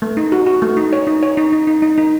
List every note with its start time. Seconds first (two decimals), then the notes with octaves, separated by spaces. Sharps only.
0.02 A3
0.17 D#4
0.32 F#4
0.46 F#4
0.62 A3
0.77 D#4
0.93 C#5
1.07 D#4
1.23 C#5
1.37 D#4
1.53 D#4
1.67 D#4
1.82 D#4
1.98 D#4